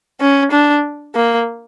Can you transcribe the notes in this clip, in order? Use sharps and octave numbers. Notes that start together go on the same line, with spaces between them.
C#4
D4
A#3